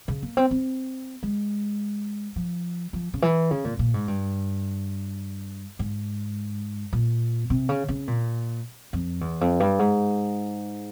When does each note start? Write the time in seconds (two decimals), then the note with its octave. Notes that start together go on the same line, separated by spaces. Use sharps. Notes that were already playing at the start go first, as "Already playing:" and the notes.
0.08 C#3
0.22 A#3
0.37 C4
0.51 C4
1.23 G#3
2.36 F3
2.93 F3
3.14 C#3
3.22 E3
3.51 C#3
3.64 A#2
3.79 A#2
3.94 G#2
4.08 G2
5.79 G#2
6.93 A#2
7.50 C3
7.69 C#3
7.88 C#3
8.08 A#2
8.93 F2
9.21 E2
9.41 F2
9.60 G2
9.79 G#2